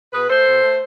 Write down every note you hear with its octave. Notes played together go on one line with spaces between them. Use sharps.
B2 G#4 B4
A3 A4 C5
B2
A3